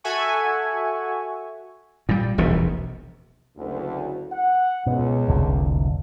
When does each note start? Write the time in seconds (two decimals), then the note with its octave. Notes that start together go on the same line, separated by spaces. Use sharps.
0.04 F#4 A4 E5 F#5 G#5 C#6
2.09 A#2 G3
2.38 E1 A#1 D#2 C3
3.57 F#1 D2
4.32 F#5
4.87 C#2 B2
5.28 F1 C2 D3